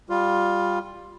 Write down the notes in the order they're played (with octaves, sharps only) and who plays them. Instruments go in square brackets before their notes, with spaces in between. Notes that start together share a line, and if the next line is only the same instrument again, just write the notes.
[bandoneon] G3 F4